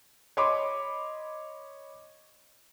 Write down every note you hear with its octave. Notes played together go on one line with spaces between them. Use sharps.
C#5 D#5 B5 C6 D6